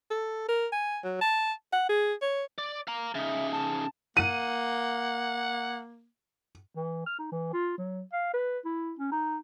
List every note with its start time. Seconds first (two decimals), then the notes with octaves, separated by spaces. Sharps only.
0.11 A4
0.49 A#4
0.72 G#5
1.04 F#3
1.21 A5
1.73 F#5
1.89 G#4
2.22 C#5
2.58 D5
2.88 F5 A#5
3.15 C#3 D#4 E5
3.53 A5
4.17 A#3 F#5 D#7
6.76 E3
7.06 F6
7.19 D#4
7.32 E3
7.53 F4
7.78 F#3
8.13 F5
8.34 B4
8.65 E4
8.99 C#4
9.11 D#4